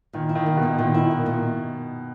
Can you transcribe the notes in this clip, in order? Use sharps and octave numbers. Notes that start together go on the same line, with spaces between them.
A#2 D#3
E4
D#3
A#3
B2
A#2
A#2 D#3
E4
A#3
A#2